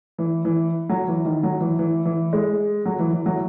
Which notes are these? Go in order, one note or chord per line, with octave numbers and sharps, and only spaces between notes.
E3
E3
F#3
E3
D#3
F#3
E3
E3
E3
G#3
F#3
E3
E3
F#3